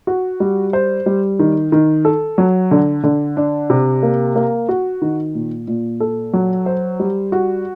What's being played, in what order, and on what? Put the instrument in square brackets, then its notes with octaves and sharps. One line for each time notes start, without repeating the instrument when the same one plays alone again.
[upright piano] F#4
G3
C5
G3
D#3
D#3
A4
F#3
D3
D3
D4
C3
A#3
A#3
F#4
D#3
A#2
A#2
A4
F#3
C5
G3
F#4